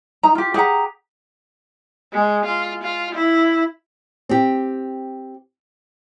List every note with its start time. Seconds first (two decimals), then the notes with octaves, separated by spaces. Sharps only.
0.23 D#4 A#5
0.35 F4 G4
0.54 G4 G#4 F#5 A#5
2.13 G#3
2.46 F4
2.83 F4
3.15 E4
4.29 C4 G4